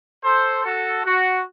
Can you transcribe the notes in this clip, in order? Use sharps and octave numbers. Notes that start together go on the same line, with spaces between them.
A4 C5
F#4 A4
F#4